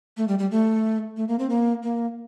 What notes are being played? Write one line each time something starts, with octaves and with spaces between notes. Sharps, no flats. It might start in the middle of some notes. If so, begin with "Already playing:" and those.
A3
G3
G3
A3
A3
A#3
C4
A#3
A#3